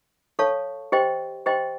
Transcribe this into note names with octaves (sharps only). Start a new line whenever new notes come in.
A4 C#5 F5 A5 C#6
G4 C5 D#5 G5 C6
G4 C5 D#5 G5 C6